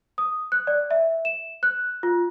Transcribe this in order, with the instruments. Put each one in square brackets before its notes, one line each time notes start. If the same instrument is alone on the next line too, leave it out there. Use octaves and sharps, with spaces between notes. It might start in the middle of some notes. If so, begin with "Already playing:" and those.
[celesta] D#6
F#6
D5
E5
E7
F#6
F4